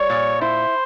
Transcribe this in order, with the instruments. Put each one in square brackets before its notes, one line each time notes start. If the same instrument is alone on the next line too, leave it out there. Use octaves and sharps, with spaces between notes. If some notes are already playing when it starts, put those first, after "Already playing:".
Already playing: [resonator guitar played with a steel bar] G3 [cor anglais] C#5
[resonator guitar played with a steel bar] A#2
[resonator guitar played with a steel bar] E4 [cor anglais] C5